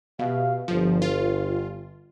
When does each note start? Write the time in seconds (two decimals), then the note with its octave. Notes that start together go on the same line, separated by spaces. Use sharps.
0.19 B2 G4 E5 F5
0.68 G1 F3
1.02 F4